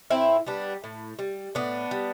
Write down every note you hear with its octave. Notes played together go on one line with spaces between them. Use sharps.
A2 C4 E4
G3 B3 D4
A2
G3
A2 B3 D4
G3